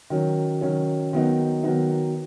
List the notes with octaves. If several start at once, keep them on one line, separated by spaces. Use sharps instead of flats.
D#3 F#3 C#4
D#3 F#3 C#4
D#3 F#3 B3 D#4
D#3 F#3 B3 D#4